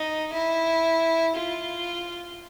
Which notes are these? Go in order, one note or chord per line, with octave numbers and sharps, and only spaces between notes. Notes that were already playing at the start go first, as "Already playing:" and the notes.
Already playing: D#4
E4
F4